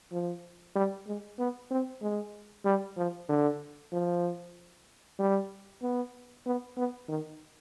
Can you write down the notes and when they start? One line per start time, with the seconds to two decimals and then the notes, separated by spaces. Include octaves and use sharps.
0.12 F3
0.76 G3
1.07 G#3
1.39 B3
1.70 C4
2.02 G#3
2.65 G3
2.97 F3
3.29 D3
3.92 F3
5.19 G3
5.82 B3
6.46 B3
6.77 B3
7.08 D#3